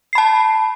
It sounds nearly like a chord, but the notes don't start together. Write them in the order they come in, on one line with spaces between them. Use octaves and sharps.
C7 B5 A5